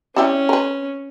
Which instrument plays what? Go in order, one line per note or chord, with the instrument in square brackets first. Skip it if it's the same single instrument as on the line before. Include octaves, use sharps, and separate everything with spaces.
[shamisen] G3 E4 G4 [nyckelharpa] C#4
[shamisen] A#4 B4